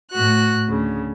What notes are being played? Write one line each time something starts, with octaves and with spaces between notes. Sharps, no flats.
A2 F#4 F#6
D2 C#3